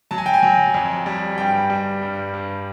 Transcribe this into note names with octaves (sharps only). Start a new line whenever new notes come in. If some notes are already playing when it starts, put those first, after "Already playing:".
F#3 A5
G#5
G5
G#5
F#3
F2
G3
G2 G5
G3
G2
G2